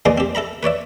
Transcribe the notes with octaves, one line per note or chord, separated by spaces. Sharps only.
E2 A#2 G#3 D5 D#5 C6
C4 G4
A4 E5 A#5 B5
B4 C#5 D5 E5